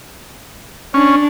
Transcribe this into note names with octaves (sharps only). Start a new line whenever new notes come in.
C#4 D4